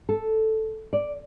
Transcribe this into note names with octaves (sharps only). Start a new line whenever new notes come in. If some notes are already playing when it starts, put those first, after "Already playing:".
A4
D5